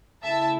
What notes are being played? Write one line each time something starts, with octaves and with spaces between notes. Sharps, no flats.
C#3 A3 E4 E5 A5